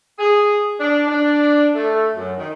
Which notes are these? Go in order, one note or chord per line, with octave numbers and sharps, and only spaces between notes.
G#4
D4
D4
A3
F#2
D#3